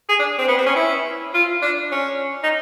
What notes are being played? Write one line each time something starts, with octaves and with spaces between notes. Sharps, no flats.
G#4
D4
C4
B3
C4
C#4
E4
F4
D4
C#4
D#4